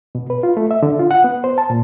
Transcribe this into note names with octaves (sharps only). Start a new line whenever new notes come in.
B2
B4
F4
A3
E5
D3
F4
F#5
B3
C5
A5
A#2